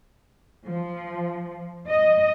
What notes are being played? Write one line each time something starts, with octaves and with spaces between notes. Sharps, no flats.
F3
D#5